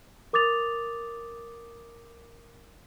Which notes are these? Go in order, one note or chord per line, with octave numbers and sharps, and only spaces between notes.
A#4 D6 D#6 A6 F7